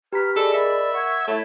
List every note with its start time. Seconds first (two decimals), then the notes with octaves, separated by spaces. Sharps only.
0.13 G4 B4 A#5 B5 F6 B6
0.36 G#4 A4 D5 D#5 B5
0.54 A#4 E5
0.93 F#5 C#6 G#6
1.27 A3 E4 C#5 E5